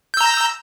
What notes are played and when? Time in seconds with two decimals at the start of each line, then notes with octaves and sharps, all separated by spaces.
0.14 G6
0.17 E6
0.21 A#5